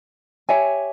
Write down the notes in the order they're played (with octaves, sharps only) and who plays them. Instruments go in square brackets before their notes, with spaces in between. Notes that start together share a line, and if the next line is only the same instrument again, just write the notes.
[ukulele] G4 C#5 E5 G#5